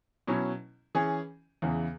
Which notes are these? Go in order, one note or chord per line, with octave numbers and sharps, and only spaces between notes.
B2 F#3 C#4 E4
E3 C#4 G#4
E2 C#3 E3